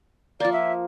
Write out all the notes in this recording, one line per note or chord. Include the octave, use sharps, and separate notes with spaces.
F3 A#3 D5
E5